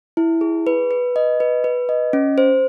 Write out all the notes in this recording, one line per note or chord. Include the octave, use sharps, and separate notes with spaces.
E4
G#4
B4
B4
D#5
B4
B4
D#5
C#4
C5